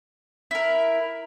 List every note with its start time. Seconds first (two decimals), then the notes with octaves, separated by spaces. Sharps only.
0.51 E4 A#4